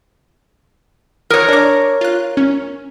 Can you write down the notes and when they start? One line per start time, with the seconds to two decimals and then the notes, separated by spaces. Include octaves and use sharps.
1.30 A#4 C#5 D#6
1.48 D4 D6
2.01 F4 F#6
2.37 C#4